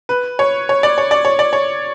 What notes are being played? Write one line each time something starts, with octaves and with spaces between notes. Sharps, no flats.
B4
C#5
C#5
D5
C#5
D5
C#5
D5
C#5